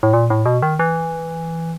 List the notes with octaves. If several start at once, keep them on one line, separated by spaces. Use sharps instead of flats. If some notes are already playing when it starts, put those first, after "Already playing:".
A2
A#2
A2
B2
D#3
E3